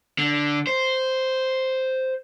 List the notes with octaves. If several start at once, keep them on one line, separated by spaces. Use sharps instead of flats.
D3
C5